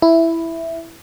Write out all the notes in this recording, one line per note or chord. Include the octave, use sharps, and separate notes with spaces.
E4